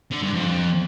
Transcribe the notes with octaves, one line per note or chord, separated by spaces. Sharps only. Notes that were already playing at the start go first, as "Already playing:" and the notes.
D3
G2
F2